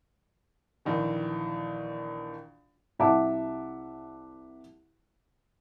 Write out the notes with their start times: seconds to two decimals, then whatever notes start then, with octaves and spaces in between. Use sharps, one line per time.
0.85 A#1 D#3 E3
2.99 C2 E5 F#5 A5 D6